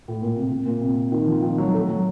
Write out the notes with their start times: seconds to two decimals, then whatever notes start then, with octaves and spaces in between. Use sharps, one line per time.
0.08 A2
0.22 A#2
0.36 C3
0.50 C#3
0.65 A#2
0.81 C3
1.12 D#3
1.27 F3
1.42 D#3
1.58 F#3
1.74 A3
1.89 F#3